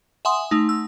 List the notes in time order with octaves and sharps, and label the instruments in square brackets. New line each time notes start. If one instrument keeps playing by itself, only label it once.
[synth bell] E5 F#5 G#5 C6 D#6
A3 D#4
E6